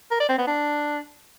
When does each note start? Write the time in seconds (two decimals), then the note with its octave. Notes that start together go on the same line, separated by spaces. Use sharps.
0.11 A#4
0.20 D5
0.29 C4
0.38 B3
0.47 D4